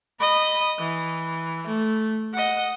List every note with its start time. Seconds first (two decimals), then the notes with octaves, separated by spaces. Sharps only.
0.20 D#5 B5
0.79 E3
1.67 A3
2.34 D#5 F#5